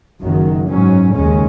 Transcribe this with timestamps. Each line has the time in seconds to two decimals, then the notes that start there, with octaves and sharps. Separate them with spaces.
0.21 F#1 F#2 D#3 F#3
0.68 G#2 F#3 C#4
1.13 D#2 C#3 G#3 C#4